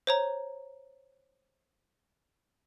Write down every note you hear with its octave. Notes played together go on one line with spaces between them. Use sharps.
C5 C#5 A#5